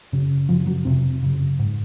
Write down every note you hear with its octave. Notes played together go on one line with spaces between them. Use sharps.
F#2 C#3
F#2 C#3 F3
F#3
F2 C3 C4
F#2 C#3
G#2